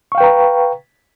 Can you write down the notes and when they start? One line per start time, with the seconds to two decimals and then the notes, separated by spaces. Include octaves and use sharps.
0.12 C#6
0.15 F5
0.18 G5
0.21 B4
0.23 A#5